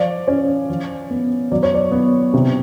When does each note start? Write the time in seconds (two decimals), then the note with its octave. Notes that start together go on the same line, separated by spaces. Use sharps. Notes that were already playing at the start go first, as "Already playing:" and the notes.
Already playing: F3 D5
0.28 C#4
0.69 F3
1.11 B3
1.52 F#3 D5
1.63 C#5
1.74 D5
1.92 B3
2.34 C3